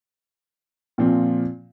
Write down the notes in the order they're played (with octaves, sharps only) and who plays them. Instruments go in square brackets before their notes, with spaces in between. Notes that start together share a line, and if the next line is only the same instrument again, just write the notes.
[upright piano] A#2 F3 C4 F4